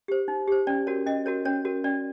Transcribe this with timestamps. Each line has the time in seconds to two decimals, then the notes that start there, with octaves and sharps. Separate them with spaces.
0.08 G4 C5
0.28 D#4
0.48 G4 C5
0.67 C#4 D5
0.87 F#4 A#4 C#5
1.06 C#4 D#5
1.26 F#4 A#4 C#5
1.45 C#4 C#5
1.65 F#4 A#4 C#5
1.84 C#4 D5